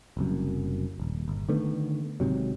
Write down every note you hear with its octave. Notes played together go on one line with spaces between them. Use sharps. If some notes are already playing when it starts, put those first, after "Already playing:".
F#1 C2 F#2
D#1
G1
D3 D#3 A3 B3
G#1 G#2 C3 F#3